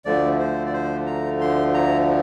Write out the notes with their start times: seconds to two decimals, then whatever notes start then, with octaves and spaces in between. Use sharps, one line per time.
0.05 D2 D3 F3 A3 D5
0.39 C5
0.66 D5
0.73 C5
1.06 A#5
1.41 C6
1.74 A#5